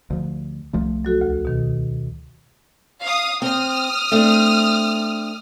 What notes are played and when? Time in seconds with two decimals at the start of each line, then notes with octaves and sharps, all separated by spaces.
0.10 D2 F3
0.73 C2 F3 A3
1.05 F#3 F#4 A4
1.21 D2
1.45 B2 D#3
3.02 F5 D#6
3.42 C4 D#6 F6
4.12 A3 C4 D4